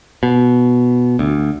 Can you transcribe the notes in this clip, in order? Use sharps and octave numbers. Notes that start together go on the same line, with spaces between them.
B2
D2